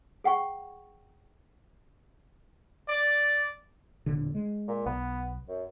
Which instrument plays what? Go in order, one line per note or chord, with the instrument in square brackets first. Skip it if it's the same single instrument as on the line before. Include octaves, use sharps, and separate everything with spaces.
[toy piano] G#4 F#5 G5 C#6
[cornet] D5
[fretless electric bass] E1 A#2 D3
G#3
[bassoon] A#2
[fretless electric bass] B1 [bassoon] B3
[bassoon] F#2